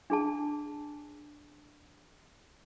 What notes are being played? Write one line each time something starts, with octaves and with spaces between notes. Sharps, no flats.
D4 G#4 A5